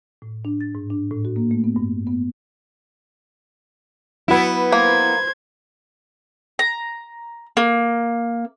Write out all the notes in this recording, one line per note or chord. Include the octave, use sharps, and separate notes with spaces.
A2
D4
A6
G#2
D4
A2
F#4
A#3
A3
B3
G2
B3
F#3 B3 E4 B4
A#3 C5 G#6
A#5
A#3